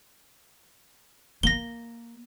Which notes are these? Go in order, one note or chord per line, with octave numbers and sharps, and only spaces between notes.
A#3 A#6 G7